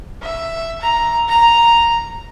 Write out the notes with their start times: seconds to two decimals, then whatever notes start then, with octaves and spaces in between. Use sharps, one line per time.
0.22 E5
0.81 A#5
1.29 A#5